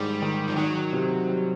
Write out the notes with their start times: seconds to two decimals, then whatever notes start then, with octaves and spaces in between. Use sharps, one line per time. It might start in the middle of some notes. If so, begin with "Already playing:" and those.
Already playing: G#2 D#3 G3
0.22 D#3
0.48 F3
0.57 D#3 F#3
0.93 C3
1.28 G3